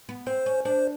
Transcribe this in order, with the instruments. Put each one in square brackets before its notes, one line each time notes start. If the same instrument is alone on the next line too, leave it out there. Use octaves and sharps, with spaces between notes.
[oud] B3
[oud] C4 [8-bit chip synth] C5
[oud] C#4
[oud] D4 [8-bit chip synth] C5